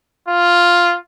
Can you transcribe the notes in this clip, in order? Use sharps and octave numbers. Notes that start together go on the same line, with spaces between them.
F4